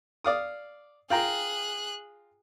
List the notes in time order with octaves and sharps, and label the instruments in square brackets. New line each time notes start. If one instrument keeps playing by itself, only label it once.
[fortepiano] D5 F5 D#6
[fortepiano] F4 G5 A#5 [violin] G#4 F#6